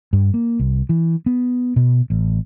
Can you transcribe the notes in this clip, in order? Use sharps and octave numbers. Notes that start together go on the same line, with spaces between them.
G2
A#3
C2
E3
B3
B2
A1